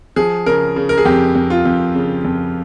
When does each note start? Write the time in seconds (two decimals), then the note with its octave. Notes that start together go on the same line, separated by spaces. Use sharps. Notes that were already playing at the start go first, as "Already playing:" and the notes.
0.16 F3 G#4
0.46 C#3 A#4
0.76 C#3
0.89 A#4
0.98 G#4
1.05 F2 G4
1.35 F2
1.50 F4
1.66 F2
1.95 C#3
2.25 F2